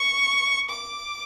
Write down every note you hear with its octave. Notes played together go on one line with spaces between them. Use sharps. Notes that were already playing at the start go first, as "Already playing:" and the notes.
Already playing: C#6
D6